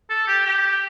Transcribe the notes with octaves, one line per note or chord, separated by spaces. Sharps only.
A4
G4
G4